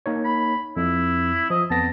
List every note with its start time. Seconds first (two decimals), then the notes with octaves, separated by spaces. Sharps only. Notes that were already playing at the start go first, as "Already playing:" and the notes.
0.06 A#3 D#4 C#5
0.25 B5
0.77 F2 E4
1.50 F3 D#5
1.70 F2 B3 A5 A#6